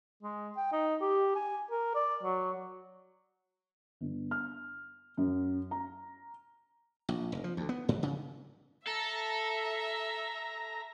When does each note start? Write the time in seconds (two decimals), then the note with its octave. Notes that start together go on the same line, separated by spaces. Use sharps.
0.23 G#3
0.57 G5
0.72 D#4
1.01 G4
1.35 G#5
1.71 A#4
1.95 D5
2.23 F#3
4.01 G1
4.31 F6
5.17 F#2
5.71 A#5
7.09 A#1
7.32 F1
7.44 F3
7.57 D2
7.69 B3
7.89 G#2
8.03 C#3
8.87 A4 E5 A#5